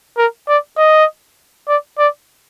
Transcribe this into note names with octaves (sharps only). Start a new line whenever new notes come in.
A#4
D5
D#5
D5
D5